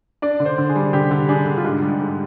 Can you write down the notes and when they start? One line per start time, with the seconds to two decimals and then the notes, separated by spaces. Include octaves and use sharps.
0.22 D4 D5
0.40 D3
0.45 C5
0.58 D3
0.69 G#4
0.76 G3
0.93 D3 G4
1.11 D3
1.29 D4 G#4
1.46 D3
1.58 F4
1.64 G#2 G4
1.82 G3
2.00 G#2